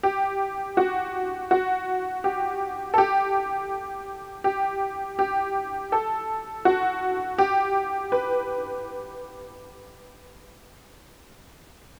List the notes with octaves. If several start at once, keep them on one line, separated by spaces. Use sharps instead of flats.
G4
F#4
F#4
G4
A4
G4
G4
G4
A4
F#4
G4
B4